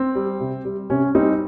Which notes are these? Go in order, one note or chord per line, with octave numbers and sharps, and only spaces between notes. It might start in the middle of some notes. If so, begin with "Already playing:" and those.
Already playing: C4
G3
C3
G3
C3 C#4
G3 C4 D#4